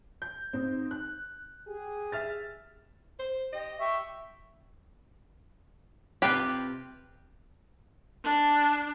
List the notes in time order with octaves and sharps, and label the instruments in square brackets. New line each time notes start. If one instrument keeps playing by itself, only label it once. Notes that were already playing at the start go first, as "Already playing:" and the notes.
[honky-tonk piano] G6
G#2 C4 D#4
F#6
[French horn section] G4 G#4
[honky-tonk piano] E5 F6 A6
[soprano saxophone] C5
[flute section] G4 [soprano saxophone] D#5
[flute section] G4 E5 C#6
[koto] C3 F4 B4 [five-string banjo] G4
[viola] D4 [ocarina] A5